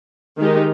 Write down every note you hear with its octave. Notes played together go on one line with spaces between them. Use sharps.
D#3 G#3 D#4 G4